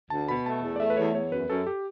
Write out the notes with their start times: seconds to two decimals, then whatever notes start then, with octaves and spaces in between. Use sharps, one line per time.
0.10 D2 A5
0.28 B2 B5
0.46 A3 A5
0.63 E2
0.76 D5
0.80 A3 E5
0.90 B4
0.97 E2 C#5
1.14 E2 C#5
1.32 F#2 B4
1.50 F#2 A4
1.67 G4